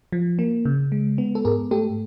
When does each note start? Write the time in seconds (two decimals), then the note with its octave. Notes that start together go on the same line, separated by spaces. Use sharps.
0.12 F3
0.39 A#3
0.65 C#3
0.92 G#3
1.18 B3
1.35 A4
1.45 G#2 G#4 A#4
1.71 A3 G4 A4